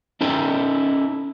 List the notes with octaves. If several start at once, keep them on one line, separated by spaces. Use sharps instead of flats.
C#4 D#4 E4 A4 G5